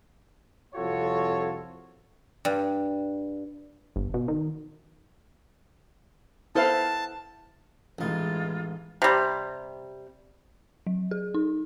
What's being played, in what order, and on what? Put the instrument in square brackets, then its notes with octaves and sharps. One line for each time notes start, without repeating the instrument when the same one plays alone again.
[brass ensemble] C2 F2 F4 F#4 A4 C#5
[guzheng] G2
[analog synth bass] G1
B2
D#3
[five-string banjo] B3 A4 C5 [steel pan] E4 F5 [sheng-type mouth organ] A5
[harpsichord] A1 D#4 [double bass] E3 G#3 [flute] F4
[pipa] C3 G3
[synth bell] F#3
G#4
D#4